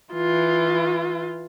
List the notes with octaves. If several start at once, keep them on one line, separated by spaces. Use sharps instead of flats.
E3 F4